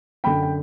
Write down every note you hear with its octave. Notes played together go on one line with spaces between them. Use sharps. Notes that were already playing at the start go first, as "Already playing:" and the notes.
F#2 D3 G5 B5
G5